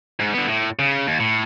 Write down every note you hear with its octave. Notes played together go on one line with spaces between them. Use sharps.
G#2
D3 B3
A2
C#3
D#2
A2